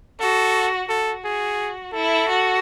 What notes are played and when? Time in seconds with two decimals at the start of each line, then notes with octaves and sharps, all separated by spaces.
0.20 F#4 A4
0.89 F#4 A4
1.25 G#4
1.93 E4 A4
2.29 F#4